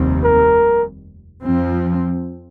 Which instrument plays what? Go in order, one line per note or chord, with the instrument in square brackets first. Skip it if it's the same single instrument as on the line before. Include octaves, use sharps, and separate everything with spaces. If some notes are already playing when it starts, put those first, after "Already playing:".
Already playing: [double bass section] F1 D#2 D#3 G3 C4
[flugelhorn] A#4
[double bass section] F2 F3 C4